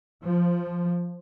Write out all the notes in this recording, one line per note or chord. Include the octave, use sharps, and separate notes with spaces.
F3